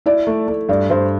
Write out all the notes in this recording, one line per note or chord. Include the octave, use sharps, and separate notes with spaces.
E4 D5
A3
A3
G2 D5
G2 C5